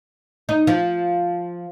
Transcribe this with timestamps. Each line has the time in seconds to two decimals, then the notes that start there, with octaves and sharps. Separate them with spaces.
0.49 D#4
0.67 F3